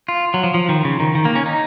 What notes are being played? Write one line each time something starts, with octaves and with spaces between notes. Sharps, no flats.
F4
F#3
F3
F3
D#3
C#3
D#3
D#3
A#3
C#4
D#4